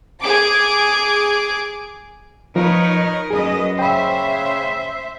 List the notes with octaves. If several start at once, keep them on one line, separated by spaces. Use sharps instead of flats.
G#4 D6
F3 D#4 A#4 B4 C#5
F#2 G#4 B4 D#5
C#3 C5 E5 G5 B5